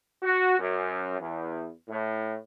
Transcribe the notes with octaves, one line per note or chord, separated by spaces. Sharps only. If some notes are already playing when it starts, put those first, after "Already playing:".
F#4
F#2
E2
A2